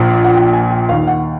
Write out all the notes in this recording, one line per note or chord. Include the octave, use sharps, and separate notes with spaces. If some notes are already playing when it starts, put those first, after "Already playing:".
Already playing: A#1 A#2 F3
F#5
G5
G#5
G5
D#2 D#3 F5
F#5